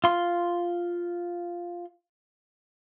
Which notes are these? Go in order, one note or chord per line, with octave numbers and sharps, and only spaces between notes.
F4 C6